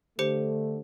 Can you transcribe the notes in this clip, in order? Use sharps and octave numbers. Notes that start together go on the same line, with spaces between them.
D3 A3 G4 C5 C#7